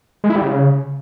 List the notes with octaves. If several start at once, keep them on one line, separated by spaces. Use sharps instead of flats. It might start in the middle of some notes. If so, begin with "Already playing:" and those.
G#3
E4
G3
C#3